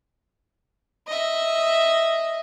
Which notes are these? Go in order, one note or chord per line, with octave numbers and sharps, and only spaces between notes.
D#5 E5